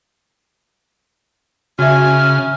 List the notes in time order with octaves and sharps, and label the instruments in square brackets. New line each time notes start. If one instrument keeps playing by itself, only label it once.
[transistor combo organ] C#3 [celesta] F#4 E5 [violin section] G#5 [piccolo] F6